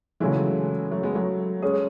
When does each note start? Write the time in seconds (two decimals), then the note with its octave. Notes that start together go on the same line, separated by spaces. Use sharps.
0.20 C#3 E3 F#3 G#3 A3 E4
0.91 F#3 A3
1.03 G#3 B3
1.15 F#3 A3
1.62 G#3 C#4 G#4